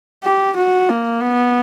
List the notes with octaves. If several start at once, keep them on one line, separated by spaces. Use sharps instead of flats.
G4
F#4
A#3
B3